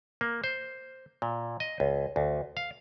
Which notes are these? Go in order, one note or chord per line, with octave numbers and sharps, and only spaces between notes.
A#3
C5
A#2
D#5
C#2
D2
F5